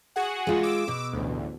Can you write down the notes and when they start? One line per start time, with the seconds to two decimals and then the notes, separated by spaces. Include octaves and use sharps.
0.16 F#4 G#4 F#5
0.47 G#3 F4
0.63 D6 E6
0.88 B2
1.13 A1 D2